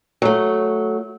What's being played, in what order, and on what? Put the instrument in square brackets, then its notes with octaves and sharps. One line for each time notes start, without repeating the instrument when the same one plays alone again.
[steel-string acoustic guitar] F#3 A3